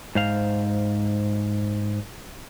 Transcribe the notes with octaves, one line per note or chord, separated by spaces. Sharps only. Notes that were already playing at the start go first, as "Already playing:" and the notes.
G#2 C5 F5